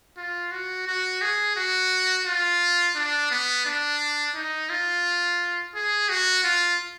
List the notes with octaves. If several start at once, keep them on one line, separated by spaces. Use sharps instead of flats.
F4
F#4
F#4
G#4
F#4
F4
D4
B3
D4
D#4
F4
G#4
F#4
F4